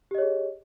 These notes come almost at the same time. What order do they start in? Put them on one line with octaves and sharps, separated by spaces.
G4 D#5 C#5 G#4